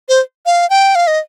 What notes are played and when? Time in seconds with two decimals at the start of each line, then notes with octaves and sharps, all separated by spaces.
0.09 C5
0.46 F5
0.70 G5
0.95 F5
1.07 D#5